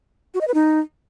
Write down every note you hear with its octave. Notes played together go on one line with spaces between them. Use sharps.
F#4
D#5
B4
D#4